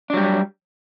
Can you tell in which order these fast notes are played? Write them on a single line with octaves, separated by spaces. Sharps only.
D4 F#3 G3